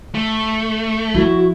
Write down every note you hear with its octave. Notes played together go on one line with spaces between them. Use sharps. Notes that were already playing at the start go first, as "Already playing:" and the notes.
A3
F3 E4 F#4